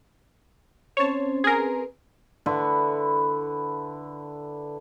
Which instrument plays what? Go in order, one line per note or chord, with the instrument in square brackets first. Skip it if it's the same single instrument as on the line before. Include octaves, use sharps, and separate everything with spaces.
[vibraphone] C4 C#4 C5 [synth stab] C#5 A5
[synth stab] G#4 A#4
[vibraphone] C4 B4
[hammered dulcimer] D3 E4 B4 C#6